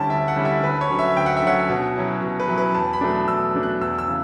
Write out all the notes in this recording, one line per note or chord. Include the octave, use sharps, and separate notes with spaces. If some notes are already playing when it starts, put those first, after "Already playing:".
Already playing: D2 D3 G3 C#4 E4 G5 A5
D2 E5
F#5
D3 G3 C#4 E4
E5
D2 B4
C#5
D3 F#3 C#4
E5
D2 G5
F#5
E5
D3 F#3 C#4 F#5
B2
F#3 C#4 E4
B2
B4
F#3 C#4 E4
B4
E2 A5
B5
B2 F#3 A3 D4
E2 E6
B2 F#3 A3 D4
F#6
E2 E6
E6
C#3 E3